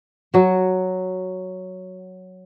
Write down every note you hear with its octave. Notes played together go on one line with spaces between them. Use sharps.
F#3 F#4